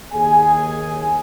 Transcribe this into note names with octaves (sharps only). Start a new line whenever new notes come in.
D#2 G#4 G#5